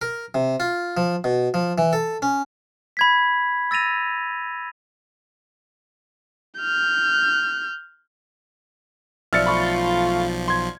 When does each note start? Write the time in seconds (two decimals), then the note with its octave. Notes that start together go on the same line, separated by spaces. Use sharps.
0.02 A#4
0.34 C3
0.60 F4
0.97 F3
1.24 B2
1.54 F3
1.78 E3
1.93 A4
2.22 C#4
2.97 B5 G#6 B6
3.71 E6 A6 A#6 D#7 F7
6.60 F6 G6
9.33 B1 F3 D5 E5 E6 F6 A6 C#7
9.46 A3 F4 B5 C#6
10.48 C6 G#6